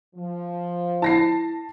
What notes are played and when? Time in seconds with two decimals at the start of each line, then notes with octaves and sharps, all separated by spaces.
0.16 F3
1.02 E4 A5 A#6 C7